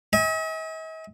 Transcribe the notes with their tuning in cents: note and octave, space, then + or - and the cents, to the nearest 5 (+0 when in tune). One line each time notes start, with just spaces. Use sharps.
D#5 +45 G#5 -30